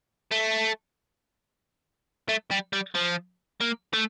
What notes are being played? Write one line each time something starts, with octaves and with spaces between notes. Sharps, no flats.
A3
A3
G3
G3
F3
A#3
A3